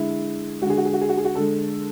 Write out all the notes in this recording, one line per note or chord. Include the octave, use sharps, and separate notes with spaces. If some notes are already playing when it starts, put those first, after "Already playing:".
Already playing: D3 G#3 E4
D3 G#3 F#4 G#4
F#4
G#4
F#4
G#4
F#4
G#4
F#4
D3 G#3 A4